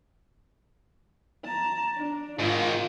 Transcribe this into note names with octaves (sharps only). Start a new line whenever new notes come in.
A5 A#5
D4
G#2 D#3 F4